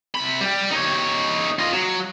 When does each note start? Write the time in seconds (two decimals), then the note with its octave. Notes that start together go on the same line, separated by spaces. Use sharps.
0.15 C3 B5
0.41 G3 G4
0.72 D#4 C#5
1.59 F4 D#5
1.73 F#3